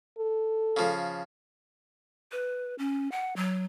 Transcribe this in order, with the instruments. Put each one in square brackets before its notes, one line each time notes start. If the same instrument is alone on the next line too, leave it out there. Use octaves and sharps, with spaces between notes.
[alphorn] A4
[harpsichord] C#3 F3
[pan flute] B4
C#4
F#5
F#3